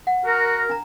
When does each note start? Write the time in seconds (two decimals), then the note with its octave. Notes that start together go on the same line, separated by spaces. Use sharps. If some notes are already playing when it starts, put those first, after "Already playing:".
0.07 F#5
0.25 F#4 A#4
0.69 D4 A#5